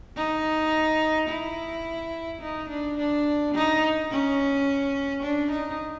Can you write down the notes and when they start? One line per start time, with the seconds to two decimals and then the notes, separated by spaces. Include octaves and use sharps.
0.16 D#4
1.29 E4
2.41 D#4
2.69 D4
2.97 D4
3.54 D#4
4.11 C#4
5.23 D4
5.51 D#4